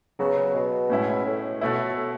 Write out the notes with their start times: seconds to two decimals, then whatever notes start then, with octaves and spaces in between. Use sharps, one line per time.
0.19 C#3 F#3 B3 F#4
0.37 C#3
0.55 B2
0.90 A2 G#3 C#4 E4
1.26 A2
1.61 B2 A3 E4
1.96 A2